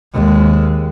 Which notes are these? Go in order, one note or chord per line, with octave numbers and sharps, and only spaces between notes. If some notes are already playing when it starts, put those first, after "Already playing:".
D#2 G#3